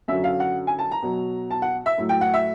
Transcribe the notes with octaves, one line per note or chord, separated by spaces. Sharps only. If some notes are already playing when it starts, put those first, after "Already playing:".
F#2 D3 F#3 E5
F5
F#5
G#5
A5
A#5
B2 F#3
A5
F#5
E5
A2 F#3
G5
F#5
E5